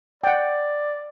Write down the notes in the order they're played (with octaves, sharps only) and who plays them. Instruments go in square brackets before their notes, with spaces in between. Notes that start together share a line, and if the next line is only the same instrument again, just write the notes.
[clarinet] D5 [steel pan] F#5 G5